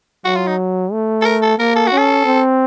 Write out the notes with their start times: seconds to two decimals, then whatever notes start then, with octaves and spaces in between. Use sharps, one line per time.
0.25 F#3 F#4
0.36 F4
0.47 D#4
0.92 A3
1.21 A4
1.25 A#4
1.42 A4
1.58 A#3 A#4
1.76 A4
1.87 F#4
1.92 C#4
1.98 A4
2.25 C4